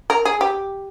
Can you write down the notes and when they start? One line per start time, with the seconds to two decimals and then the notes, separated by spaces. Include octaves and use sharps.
0.10 A#4
0.25 G#4
0.41 G4